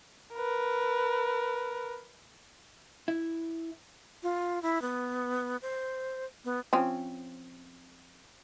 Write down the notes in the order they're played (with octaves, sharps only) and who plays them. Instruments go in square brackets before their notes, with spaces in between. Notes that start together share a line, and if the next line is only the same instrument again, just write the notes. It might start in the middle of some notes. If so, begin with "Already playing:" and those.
[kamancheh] A#4 B4
[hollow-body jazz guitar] E4
[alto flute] F4
E4
B3
C5
B3
[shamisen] F3 C4 C#4